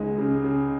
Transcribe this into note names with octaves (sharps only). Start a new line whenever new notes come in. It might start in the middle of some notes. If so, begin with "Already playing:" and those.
Already playing: C#2 G#3 D#4
C#3
C#3